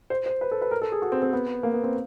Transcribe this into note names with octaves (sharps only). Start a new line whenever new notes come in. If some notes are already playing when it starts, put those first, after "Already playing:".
C5
C5
B4
A4
B4
A#4
A4
G#4
F#4
C4
C4
B3
A#3
B3
C4